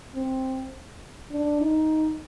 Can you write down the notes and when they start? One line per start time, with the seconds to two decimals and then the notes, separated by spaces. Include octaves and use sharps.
0.15 C4
1.31 D4
1.61 D#4